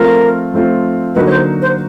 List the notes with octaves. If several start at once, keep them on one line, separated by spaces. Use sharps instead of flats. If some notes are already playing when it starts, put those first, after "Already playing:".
Already playing: F3 A3 C4 F4 A#4
F3 A3 C4 F4
D3 F#3 A#3 D#4 F#4 B4
C#5
C5
C5